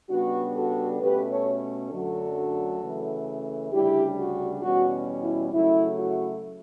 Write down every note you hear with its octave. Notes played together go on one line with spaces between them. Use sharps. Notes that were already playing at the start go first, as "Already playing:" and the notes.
C#3 G3 B3 D4 F#4
F#4 A4
B2 A3 C#4 G4 B4
A4 C#5
F#2 D3 F#3 A3 D4 F#4 A4
C#3 E3 A3
D2 C#3 G3 D4 E4 G4
F#4
E2 B2 G3 C#4 F#4
E4
C#3 F#3 A3 E4
F#4